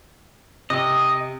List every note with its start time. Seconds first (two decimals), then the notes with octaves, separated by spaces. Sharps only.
0.70 C3 D#5